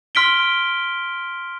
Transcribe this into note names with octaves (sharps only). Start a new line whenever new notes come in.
C6 F6 B6 D7 G7